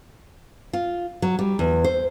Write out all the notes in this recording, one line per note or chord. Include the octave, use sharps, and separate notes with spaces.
F4
F#3
G3
E2
C5